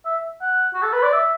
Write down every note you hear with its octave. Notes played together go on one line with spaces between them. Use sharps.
E5
F#5
F#4
A4
B4
D5
E5